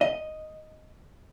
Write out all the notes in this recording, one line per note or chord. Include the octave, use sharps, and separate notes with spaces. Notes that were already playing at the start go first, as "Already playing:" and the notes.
D#5